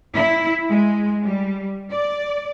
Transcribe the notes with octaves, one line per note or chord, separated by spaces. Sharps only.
E4
G#3
G3
D5